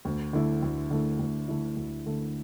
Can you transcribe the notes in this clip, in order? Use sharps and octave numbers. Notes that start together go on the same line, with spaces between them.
D2
D3 A3 E4
D2
D3 A3 E4
D2
D3 A3 E4
D2
D3 A3 E4